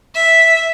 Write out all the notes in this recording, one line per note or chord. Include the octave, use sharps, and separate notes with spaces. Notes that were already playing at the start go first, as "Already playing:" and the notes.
E5